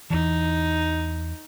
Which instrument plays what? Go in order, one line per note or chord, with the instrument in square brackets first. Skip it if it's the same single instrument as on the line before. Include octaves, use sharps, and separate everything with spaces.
[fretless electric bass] E2 E3 [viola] D#4